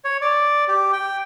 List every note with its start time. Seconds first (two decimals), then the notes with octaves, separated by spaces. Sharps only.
0.05 C#5
0.22 D5
0.68 G4
0.93 G5